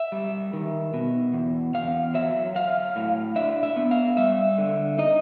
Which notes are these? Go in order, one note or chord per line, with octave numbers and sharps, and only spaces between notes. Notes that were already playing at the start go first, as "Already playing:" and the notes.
Already playing: E5
G3
D#3
B2
E2
E2 F5
F#3 E5
F#3 F5
A2
D4 E5
E5
B3
F5
G3 E5
D3
D#4 D#5